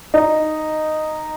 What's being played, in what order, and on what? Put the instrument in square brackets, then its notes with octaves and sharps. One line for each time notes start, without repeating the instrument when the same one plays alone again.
[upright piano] D#4